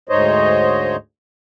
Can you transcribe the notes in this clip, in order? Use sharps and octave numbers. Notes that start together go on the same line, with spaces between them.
D2 G#2 D#4 C5 C#5 D#5